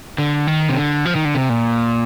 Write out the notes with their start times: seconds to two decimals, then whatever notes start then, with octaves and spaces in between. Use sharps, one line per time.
0.18 D3
0.47 D#3
0.69 C3
0.77 D3
1.05 F3
1.15 D#3
1.25 D3
1.35 C3
1.49 A#2